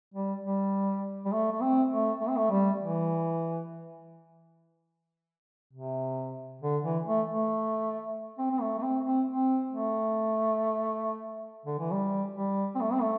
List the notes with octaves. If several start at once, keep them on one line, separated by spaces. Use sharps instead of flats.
G3
G3
G3
A3
A3
C4
A3
A3
C4
A3
G3
E3
C3
D3
E3
A3
A3
C4
C4
A3
A3
C4
C4
C4
A3
D3
E3
G3
G3
C4
A3
C4
A3